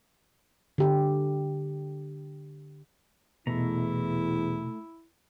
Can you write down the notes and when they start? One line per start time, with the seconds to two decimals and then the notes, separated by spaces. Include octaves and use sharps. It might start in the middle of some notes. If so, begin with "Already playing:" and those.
0.78 D3 G4
3.47 E2 B2 A3 E4 A#5